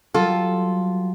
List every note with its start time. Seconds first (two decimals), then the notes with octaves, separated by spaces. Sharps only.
0.14 F#3 G3 F4 A4